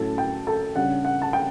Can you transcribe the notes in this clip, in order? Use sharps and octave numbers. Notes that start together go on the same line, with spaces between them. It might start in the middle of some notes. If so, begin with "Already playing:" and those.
Already playing: A2 F#3 C#4 E4 A4 A5
G5
A4 A5
C#3 G3 D4 F#5
F#5
A5
G5